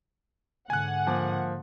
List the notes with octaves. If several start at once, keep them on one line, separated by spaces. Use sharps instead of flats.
G#2 D3 F#5 G#5 F#6
F3 A#3 D6